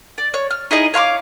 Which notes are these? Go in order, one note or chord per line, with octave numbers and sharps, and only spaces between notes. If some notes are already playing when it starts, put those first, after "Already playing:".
D5
C#5
F6
D#4 E4 G#4 D#5
C#5 F5 C6 D6